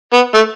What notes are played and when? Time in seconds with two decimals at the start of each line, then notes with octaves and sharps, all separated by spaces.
0.13 B3
0.34 A3